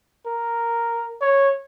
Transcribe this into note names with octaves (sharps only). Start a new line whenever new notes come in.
A#4
C#5